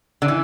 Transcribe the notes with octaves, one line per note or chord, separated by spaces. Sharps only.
D3
E3